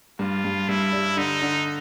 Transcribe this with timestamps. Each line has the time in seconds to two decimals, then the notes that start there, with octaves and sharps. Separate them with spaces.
0.19 G2 F4
0.45 G2
0.69 G2 E4
0.92 G3
1.17 D3 D#4
1.42 D3